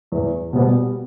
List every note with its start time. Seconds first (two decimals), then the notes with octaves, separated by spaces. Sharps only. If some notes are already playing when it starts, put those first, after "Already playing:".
0.12 E2
0.53 B2 G3 B3